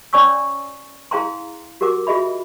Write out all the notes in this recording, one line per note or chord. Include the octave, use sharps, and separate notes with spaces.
C#4 C#5 D5 G#5 C#6 E6
E4 G#4 F5 G5 A#5 C6
F#4 G4 A#4 F#5 D6
F4 F#4 G#4 D#5 E5 B5